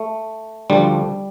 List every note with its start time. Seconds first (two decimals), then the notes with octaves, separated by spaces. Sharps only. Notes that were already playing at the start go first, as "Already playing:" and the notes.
Already playing: A3
0.70 D2 D3 F3 G3